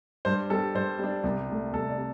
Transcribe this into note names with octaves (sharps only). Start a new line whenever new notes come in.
G2 C5
G3 D4 A4
G2 C5
G3 D4
C2
C3 A3
C2 A4
D5
C3